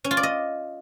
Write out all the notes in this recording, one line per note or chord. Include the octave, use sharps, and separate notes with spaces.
C#4
F4
D5
D#5